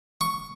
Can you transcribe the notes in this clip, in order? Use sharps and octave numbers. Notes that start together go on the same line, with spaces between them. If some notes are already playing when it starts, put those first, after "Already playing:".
C#6